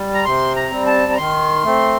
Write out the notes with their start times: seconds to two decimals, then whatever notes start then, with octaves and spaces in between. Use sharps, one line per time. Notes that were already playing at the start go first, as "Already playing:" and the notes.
Already playing: G3
0.14 A#5
0.25 C3 C6
0.56 A#5
0.71 G3 C4
0.87 A5
1.12 A#5
1.17 D#3 C6
1.64 A3 C4